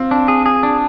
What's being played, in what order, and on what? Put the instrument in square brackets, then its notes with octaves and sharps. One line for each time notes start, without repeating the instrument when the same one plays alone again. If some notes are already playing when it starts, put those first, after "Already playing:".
Already playing: [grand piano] C4 F4
[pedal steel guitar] D4
G#4
G#4
D4